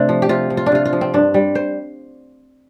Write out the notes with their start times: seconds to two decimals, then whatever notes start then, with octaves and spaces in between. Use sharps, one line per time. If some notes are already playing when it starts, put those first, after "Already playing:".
Already playing: C3 A3 C4 D4
0.09 F3
0.22 G4
0.29 C3 F4
0.50 F3
0.57 F4
0.66 D4
0.72 C3 F4
0.85 F4
0.93 F3
1.01 C4
1.14 G2 D4
1.34 G3
1.55 C5